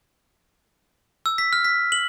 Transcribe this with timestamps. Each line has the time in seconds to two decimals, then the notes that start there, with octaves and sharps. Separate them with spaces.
1.26 E6
1.38 B6
1.53 F6
1.65 B6
1.92 F#7